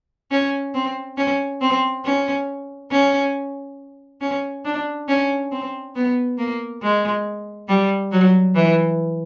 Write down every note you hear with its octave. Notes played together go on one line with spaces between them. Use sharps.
C#4
C4
C#4
C4
C#4
C#4
C#4
D4
C#4
C4
B3
A#3
G#3
G3
F#3
E3